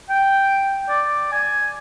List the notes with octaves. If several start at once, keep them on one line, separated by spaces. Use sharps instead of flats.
G5
D5
G#5